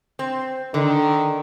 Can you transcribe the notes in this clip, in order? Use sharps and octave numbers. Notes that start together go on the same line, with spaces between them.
C4
D3 D#3